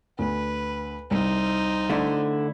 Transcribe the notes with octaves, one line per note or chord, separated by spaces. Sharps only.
D2 B4
C2 D#4 C5
D3 A3 D4 E4